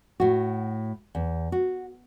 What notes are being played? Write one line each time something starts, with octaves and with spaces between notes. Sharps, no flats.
A2 F#4
E2
F#4